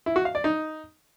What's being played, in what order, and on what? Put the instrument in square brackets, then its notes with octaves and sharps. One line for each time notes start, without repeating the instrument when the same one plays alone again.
[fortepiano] E4
F#4
F5
D5
D#4